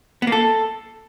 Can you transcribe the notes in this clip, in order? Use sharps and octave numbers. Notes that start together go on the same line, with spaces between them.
B3
A#3
A4